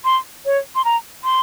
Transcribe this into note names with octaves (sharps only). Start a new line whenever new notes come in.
C6
C#5
C6
A#5
C6